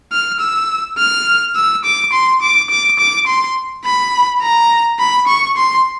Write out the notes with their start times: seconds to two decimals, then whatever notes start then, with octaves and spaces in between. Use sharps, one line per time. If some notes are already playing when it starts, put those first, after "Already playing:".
0.12 F6
0.40 E6
0.98 F6
1.56 E6
1.85 D6
2.13 C6
2.42 D6
2.70 D6
2.99 D6
3.27 C6
3.85 B5
4.42 A#5
5.00 B5
5.27 C#6
5.57 C6